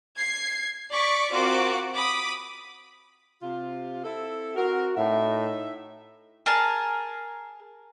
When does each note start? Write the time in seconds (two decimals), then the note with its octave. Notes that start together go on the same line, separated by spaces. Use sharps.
0.15 G#6 C7
0.93 D5 C#6 D6 B6
1.32 C4 F4 F#4 A#4 D6
1.95 B5 D6 D#6
3.42 C3 F4
4.04 C4 E4 A4
4.56 C4 F#4 A#4
4.97 A2 D#4 E5
6.46 G#4 A#4 G#5 A5